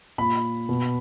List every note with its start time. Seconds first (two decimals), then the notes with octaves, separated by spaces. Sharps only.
0.18 A#2 B5
0.69 B2